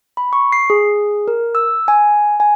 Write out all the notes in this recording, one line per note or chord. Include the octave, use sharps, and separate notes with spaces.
B5
C#6
C7
G#4
A#4
E6
G#5
G#5